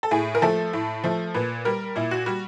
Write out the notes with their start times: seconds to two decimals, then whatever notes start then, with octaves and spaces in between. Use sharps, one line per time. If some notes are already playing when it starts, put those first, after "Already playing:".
0.03 A4
0.11 A2 G#4
0.35 A#4
0.42 F3 A3 A4
0.73 A2
1.04 F3 A3
1.34 A#2 B4
1.65 G3 A#4
1.96 A#2 E4
2.11 F#4
2.26 G3 F#4